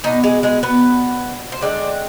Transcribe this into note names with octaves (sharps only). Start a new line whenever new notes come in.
B2 B3 D4 D#4 D#5
G#3 G#4
G#3 G#4
B3 B4
C5
D3 G#3 C4 D4 D5